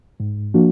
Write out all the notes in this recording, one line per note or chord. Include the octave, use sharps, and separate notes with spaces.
G#2
F3 A#3 D4 F#4